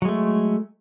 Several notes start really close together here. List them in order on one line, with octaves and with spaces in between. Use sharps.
F#3 G#3 A3